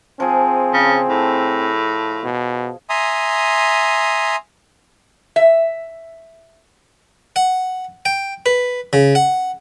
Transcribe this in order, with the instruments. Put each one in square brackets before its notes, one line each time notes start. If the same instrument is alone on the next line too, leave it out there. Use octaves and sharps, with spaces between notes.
[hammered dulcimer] F3 G#4 [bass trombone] C4
[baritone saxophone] C#3
A2
[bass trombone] B2
[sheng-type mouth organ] E5 G#5 A#5 C6 D#6
[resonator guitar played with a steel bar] E5
[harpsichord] F#5
G5
B4
C#3
F#5